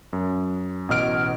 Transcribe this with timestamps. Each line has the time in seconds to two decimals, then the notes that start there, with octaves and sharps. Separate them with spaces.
0.13 F#2
0.89 A1 B2 D#5 F6 D7